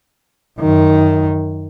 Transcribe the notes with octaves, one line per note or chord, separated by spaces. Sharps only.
F#2 D#3